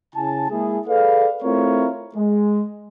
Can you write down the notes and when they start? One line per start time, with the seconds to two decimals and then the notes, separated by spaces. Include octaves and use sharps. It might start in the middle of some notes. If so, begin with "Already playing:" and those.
0.16 C#3 E4 G#5 A5
0.50 G#3 A#3 E4 G#4
0.88 G#4 A4 B4 D5 F5
1.43 A3 C4 E4 F4 A#4 C#5
2.15 G#3